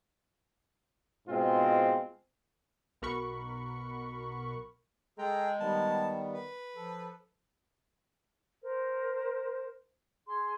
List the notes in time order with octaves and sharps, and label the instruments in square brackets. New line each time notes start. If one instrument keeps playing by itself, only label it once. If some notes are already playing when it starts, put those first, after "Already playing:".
[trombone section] G#2 B2 G#3 C4 F4
[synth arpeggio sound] B1 B2 A#4 F#5 B5 C#6
[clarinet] G#3 [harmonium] G#4 A4 A#5 [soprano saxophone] G5
[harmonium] D#3 G3 B3 [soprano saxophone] A5
[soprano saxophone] B4
[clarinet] F3 [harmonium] A4
[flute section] A#4 C5
G#4 C6